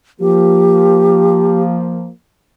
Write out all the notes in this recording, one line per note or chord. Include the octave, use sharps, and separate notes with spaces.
F3 A#3 G4